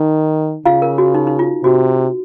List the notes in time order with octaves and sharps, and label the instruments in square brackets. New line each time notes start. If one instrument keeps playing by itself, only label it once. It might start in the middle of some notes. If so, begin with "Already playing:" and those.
Already playing: [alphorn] D#3 [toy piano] D#4
[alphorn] C#3 [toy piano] F4 F5
[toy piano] A#4
F#4
D#4
D#4
F4
[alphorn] C3 [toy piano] F#4